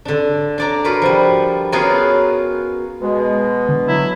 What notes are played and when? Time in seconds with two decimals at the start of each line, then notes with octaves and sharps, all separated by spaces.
0.05 D3 D4
0.58 D4 D5 A#5
0.84 F4 F#4 A#4 B4
1.02 F3 G3
1.72 B3 C#4 F4 F#4 G#4 A#4
3.02 B2 G#3
3.69 D3
3.88 F#3 E4